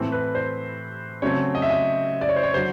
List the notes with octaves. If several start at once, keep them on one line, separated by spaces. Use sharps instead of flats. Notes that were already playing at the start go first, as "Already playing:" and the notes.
Already playing: A2 E3 A3 C4
B4
C5
C#3 F#3 A3 C4 C#5
D#5
E5
D#5
D5
C#5
C5
C#5
D3 F#3 C5